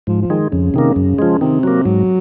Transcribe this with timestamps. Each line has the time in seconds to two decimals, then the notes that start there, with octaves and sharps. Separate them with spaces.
0.07 G#2 F3
0.22 F3
0.30 D#3 G#3
0.52 F2 C#3
0.74 C3 D#3 A#3
0.96 F#2
1.19 F3 G#3
1.41 C3 D#3
1.63 F#3 A#3
1.85 G#2 F#3